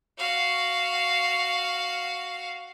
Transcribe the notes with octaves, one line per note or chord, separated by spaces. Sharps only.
F#4 F5